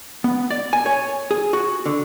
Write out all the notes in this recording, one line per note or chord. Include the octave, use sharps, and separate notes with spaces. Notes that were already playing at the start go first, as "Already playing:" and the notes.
B3
D5
G#5
C#5
G#4
F#4
D3